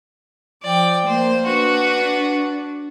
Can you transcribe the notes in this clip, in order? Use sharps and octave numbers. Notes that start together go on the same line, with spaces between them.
F3 D5 G5
A#3 C5
D4 F#4 B4